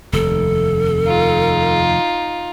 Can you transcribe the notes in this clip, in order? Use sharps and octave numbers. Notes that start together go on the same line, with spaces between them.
F1 D#2 A4
D#4 F4